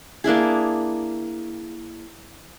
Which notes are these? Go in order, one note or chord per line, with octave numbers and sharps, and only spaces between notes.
A#3 D4 E4 G#4